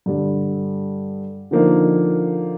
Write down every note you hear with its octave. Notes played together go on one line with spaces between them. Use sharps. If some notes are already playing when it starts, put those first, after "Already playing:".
G2 D3 G3
D3 F3 A#3 D#4